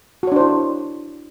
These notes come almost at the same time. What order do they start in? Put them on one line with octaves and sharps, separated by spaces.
F#4 C#5 D4 C5 E4